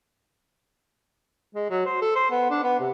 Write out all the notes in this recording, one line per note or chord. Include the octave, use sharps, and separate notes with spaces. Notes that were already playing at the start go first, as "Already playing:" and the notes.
G#3
F#3
C5
A4
C5
B3
D4
B3
C3